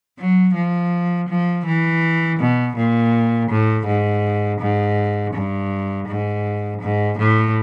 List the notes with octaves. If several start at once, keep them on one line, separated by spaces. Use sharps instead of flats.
F#3
F3
F3
E3
B2
A#2
A2
G#2
G#2
G2
G#2
G#2
A2